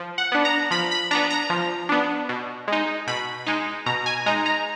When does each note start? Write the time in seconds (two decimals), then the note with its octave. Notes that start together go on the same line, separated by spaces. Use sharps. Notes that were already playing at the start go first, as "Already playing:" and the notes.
Already playing: F3
0.18 F#5
0.32 B3 D4
0.45 A#5
0.71 F3 B5
0.91 B5
1.11 B3 D4 A#5
1.30 A#5
1.50 F3
1.89 B3 D4
2.29 B2
2.68 G#3 D#4
3.07 B2 B5
3.47 G#3 D#4
3.86 B2 A#5
4.06 G#5
4.26 G#3 D#4 A#5
4.46 A#5